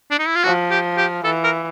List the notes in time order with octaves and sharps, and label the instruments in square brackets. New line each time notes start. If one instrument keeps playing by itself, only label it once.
[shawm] D4
D#4
E4
F4
[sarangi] F3 [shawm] F#4
[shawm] G4
G4
[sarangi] E3 [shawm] A4
[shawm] A#4